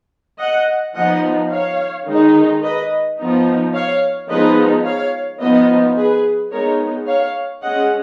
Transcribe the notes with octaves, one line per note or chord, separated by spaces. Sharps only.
D#5 F#5
F3 B3 D#4 D#5 F#5
C#5 F5
D#3 G#3 D#4
B4 D#5
F3 B3 D#4
C#5 F5
F3 G#3 B3 D#4 B4 D#5
C#5 F5
F3 B3 D#4 B4 D#5
G#4 B4
G#3 B3 D#4 A#4 C#5
C#5 F5
G#3 C#4 D#5 F#5